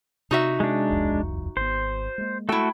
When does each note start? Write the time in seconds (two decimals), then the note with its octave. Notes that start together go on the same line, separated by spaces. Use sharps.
0.31 C3 D#4 F#4 E5
0.60 G#3 D4
0.90 D#1 C2 F2
1.57 G#1 B3 C5
2.18 G#3 A#3
2.49 A3 E4 F#4 A4 G5